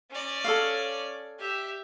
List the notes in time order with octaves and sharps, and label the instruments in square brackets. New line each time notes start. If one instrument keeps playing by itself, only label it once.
[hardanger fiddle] C#4 D5
[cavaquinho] A4 C#5 F5
[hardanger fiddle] G4 E5